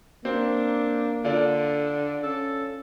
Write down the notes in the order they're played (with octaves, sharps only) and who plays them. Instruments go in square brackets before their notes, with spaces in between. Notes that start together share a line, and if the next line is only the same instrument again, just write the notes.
[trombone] A#3 [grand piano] C4 [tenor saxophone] D4
[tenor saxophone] D3 [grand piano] D4 F4
[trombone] C#4 [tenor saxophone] A4